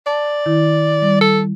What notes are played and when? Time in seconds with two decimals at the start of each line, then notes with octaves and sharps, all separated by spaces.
0.07 D5 A5
0.46 D#3 E4
1.02 G3
1.21 A4